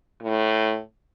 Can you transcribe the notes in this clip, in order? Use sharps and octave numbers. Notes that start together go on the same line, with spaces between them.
A2